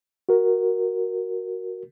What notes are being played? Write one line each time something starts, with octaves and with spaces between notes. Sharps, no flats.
F#4 A#4